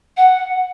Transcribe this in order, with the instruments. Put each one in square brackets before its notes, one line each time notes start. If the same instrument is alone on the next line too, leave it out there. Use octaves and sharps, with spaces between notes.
[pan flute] F#5